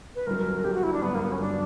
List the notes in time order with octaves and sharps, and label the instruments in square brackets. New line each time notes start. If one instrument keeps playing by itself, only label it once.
[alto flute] B4
[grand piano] G1 G2 F#3 [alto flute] A#4
[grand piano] G1 G2 F#3 [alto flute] G4
[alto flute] F#4
E4
D4
[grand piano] G1 G2 F#3 [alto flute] B3
[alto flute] A#3
B3
C#4
[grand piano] G1 F#3 [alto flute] D4